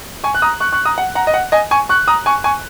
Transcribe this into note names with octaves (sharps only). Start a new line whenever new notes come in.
G#5 C#6
F#6
A#5 D#6
C#6 F#6
C#6 F#6
A#5 D#6
F#5
F#5 A#5
D#5
F#5
D#5 G#5
G#5 C#6
C#6 F#6
A#5 D#6
G#5 C#6
G#5 C#6